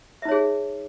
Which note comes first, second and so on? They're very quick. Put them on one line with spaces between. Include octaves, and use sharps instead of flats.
E5 D#4 C#5 G#4